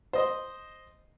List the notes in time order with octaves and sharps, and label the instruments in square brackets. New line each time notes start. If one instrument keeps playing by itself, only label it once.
[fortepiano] C5 D#5